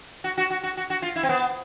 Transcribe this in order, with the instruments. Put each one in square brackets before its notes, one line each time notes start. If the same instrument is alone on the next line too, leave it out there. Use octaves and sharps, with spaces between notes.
[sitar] F#4
F#4
F#4
F#4
F#4
F#4
F4
E4
C4
B3